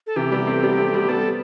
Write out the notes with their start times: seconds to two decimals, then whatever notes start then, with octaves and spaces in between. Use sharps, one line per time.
0.07 A4
0.16 C3 E3 G4
0.32 G3 B3
0.47 A3 C4
0.63 G3 B3
0.78 A3 C4
0.94 G3 B3
1.09 G3 B3 A4